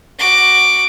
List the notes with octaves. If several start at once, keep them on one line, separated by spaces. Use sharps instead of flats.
F#4 D6